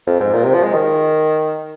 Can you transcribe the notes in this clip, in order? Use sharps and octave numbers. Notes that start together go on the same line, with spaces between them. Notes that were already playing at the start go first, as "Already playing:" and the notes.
F2
G#2
A#2
C3
F3
G#3
D#3